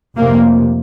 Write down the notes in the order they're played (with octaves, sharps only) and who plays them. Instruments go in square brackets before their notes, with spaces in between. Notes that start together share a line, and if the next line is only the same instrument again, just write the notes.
[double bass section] F1 F2 C3 A#3